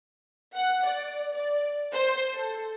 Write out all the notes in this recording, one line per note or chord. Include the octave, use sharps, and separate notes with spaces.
F#5
D5
D5
C5
A4